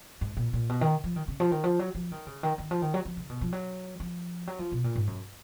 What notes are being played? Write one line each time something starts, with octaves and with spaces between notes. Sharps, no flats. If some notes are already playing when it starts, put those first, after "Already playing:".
G#2
A#2
A#2
B2
D#3
F3
D#3
C#3
F3
D#3
F3
F#3
F3
D#3
C#3
D#3
D#3
F3
D#3
F#3
F3
C#3
B2
F3
F#3
F3
F#3
F3
B2
A#2
G#2
F#2